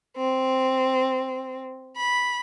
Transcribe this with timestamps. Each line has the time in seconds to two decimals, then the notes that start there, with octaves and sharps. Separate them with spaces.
0.18 C4
1.97 B5